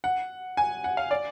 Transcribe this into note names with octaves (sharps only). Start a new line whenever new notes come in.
F#5
G#5
F#5
F5
D5